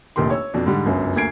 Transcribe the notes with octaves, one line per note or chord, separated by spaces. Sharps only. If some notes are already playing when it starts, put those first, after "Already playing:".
F1 A#1 D#3 G4 C6
C#5 E6
F2 B2 D4
G#2 D3 G3
G1 C#2 F#2
D2 A#3 G#5 G#6 C7 D7